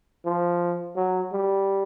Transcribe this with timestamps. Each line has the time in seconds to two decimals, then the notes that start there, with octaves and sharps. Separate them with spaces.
0.25 F3
0.96 F#3
1.32 G3